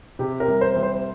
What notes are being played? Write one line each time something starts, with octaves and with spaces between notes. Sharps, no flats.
C3 G4
A#4
C2
C5
C2
C5